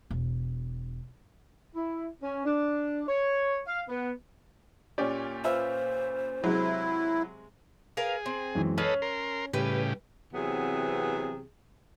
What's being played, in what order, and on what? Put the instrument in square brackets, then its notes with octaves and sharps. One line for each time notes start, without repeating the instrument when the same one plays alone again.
[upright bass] E1
[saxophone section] E4
C#4
D4
C#5
F5
B3
[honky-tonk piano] A#2 C#4 G4 [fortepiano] C#5 D5
[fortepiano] F4 B4 E5 [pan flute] C5
[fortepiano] C3 G#3 [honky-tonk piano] F#3 [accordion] E4
[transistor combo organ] G#4 [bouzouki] A#4 B4 F5
[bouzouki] C4
[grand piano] F#2 E3 G#3
[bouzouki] C#4 [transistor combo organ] A4 B4 D#5 [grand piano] F6 C7
[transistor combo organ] A#4 C6
[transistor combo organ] A2 C#3 G4 [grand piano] G3 [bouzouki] B4
[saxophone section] C3 E3 F#3 B3 C4 G#4